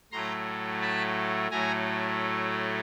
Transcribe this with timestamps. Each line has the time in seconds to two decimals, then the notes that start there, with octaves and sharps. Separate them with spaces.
0.12 A2 F#3 A3 A#5 C6
0.82 A5 B5
1.51 A2 F#3 A3 G#5 A#5